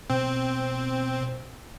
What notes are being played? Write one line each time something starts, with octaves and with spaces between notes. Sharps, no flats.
B2 C4